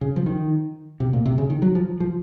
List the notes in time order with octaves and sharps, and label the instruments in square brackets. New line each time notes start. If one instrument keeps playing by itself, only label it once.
[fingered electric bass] C#3
F3
D#3
C3
A#2
C3
C#3
D#3
F#3
F3
F3